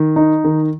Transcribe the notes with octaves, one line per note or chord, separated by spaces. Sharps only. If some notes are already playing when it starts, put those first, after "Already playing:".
Already playing: D#3
D#4
D#3